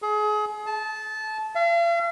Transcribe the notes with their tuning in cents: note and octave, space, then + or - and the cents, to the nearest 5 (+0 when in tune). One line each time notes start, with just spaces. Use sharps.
G#4 +30
A5 -20
F5 -45